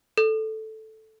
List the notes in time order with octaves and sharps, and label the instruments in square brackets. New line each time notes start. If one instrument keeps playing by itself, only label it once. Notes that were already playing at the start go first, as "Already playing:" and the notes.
[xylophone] A4